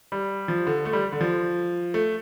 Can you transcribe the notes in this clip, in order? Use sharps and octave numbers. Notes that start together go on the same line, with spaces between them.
G3
F3
D3
A3
G3
D3
F3
A3